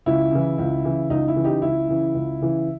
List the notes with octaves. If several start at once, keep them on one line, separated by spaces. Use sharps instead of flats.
C#2 E4
C#3 E3
C#2
C#3 E3
C#2 D#4
E4
C#3 E3
D#4 G4
C#2 E4
C#3 E3
C#2
C#3 E3